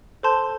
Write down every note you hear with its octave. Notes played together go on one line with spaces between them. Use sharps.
A4 C5 A5 C6 G6